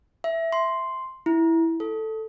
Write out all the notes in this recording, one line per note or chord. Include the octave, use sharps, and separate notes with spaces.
E5
C6
E4
A4